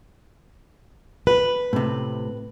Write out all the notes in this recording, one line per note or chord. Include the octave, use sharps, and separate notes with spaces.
B4
A2 C3